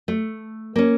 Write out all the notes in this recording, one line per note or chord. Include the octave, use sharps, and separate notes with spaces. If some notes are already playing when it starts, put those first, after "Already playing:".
A3
A#3 C#4